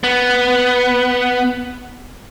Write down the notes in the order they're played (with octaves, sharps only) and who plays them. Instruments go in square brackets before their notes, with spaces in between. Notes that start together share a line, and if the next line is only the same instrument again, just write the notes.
[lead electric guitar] B3